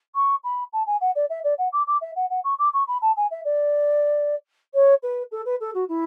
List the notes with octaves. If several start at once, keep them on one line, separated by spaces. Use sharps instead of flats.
C#6
B5
A5
G#5
F#5
D5
E5
D5
F#5
D6
D6
E5
F#5
F#5
C#6
D6
C#6
B5
A5
G#5
E5
D5
C#5
B4
A4
B4
A4
F#4
E4